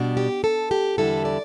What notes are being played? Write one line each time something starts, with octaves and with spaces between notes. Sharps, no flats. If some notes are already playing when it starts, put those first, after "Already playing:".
Already playing: B2 G3 D4
G4
A4
G4
E2 D3 G3 E4 A4
D5